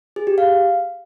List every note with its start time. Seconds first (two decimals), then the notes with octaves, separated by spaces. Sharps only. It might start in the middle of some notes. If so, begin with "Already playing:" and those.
0.16 G#4
0.27 G4
0.38 F5